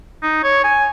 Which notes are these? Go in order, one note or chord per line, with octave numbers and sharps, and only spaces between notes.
D#4
C#5
G#5